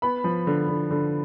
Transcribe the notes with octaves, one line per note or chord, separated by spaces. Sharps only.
B3 B5
F3
D3
D3
D3